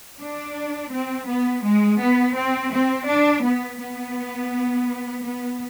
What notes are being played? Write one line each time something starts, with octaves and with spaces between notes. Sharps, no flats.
D4
C4
B3
G#3
B3
C4
C4
D4
B3
B3
B3